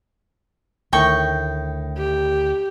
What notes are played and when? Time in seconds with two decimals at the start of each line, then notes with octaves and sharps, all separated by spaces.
0.93 D2 A2 D#3 G5 C#6
1.98 G4